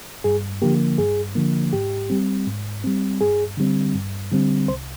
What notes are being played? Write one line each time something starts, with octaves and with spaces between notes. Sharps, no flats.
G2 G#4
D3 F3 A#3 G4
G2 G#4
D3 F3 A#3
G#2 G4
G3 C4
G#2
G3 C4
G2 G#4
D3 G3 C4
G2
D3 G3 C4
C2 C5